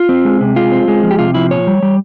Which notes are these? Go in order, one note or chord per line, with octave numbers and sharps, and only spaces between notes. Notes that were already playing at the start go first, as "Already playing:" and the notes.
Already playing: F4
C4
G#3
C3
G#3 F4
C4
G#3
F3
G4
C3 F4
F3 E4
A#2 C#5
G3
G3